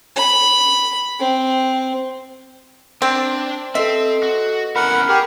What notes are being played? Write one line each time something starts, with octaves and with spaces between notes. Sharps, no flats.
B5
C4
C4 D4
C4 A4 B4 C5 D#5 E5
F#4
B3 C#4 E4 A#4 F#5 B5
G4 G#4 A#4